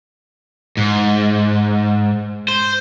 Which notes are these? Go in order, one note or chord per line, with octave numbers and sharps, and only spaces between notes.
G#2
C5